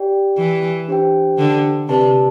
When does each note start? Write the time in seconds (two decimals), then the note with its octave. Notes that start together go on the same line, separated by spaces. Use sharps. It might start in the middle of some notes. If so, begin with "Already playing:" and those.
Already playing: G4 D5 G5
0.37 E3
0.88 D4 G4 C5 G5
1.38 D3
1.89 C3 G4 B4 D5 A5